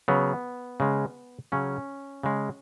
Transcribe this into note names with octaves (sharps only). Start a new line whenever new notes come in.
C#3 F#3 B3
C#3 G#3
C#3 F#3 C#4
C#3 G#3